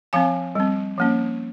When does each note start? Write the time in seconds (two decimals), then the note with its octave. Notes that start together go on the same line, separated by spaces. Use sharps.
0.13 F3 C4 F5 G#5
0.55 G3 C4
0.97 F3 A#3 C#4